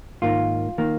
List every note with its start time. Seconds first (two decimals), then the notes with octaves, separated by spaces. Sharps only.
0.22 G#2 D#3 A#3 F4
0.78 D#3 A#3